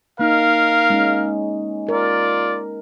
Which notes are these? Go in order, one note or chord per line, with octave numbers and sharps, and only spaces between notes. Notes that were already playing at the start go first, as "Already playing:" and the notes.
A#3 D#4 A#4 F5
G#3 C#4 D#4
F4 A#4 D5